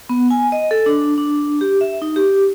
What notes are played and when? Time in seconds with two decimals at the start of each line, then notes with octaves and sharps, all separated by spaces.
0.09 B3
0.30 G#5
0.52 D#5
0.71 A4
0.86 D4
1.18 D4
1.61 G4
1.81 E5
2.02 D#4
2.16 G4